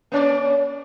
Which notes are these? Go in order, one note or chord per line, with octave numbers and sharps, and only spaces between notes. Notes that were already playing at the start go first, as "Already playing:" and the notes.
A#3 C#4 D5